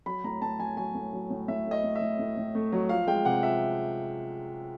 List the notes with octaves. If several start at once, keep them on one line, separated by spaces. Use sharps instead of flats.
F#3 B5
A2 A#5
A2 A5
F#3 G#5
F#3 G#5
A2
F#3
A2
A2 E5
A3
D#5
A2
E5
A2
A2
A2
A3
F#3
F3 F5
G#3 G5
C3 F#5
F3 E5